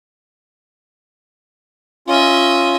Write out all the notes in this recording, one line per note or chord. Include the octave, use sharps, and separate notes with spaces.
C#4 F4 D#5 E5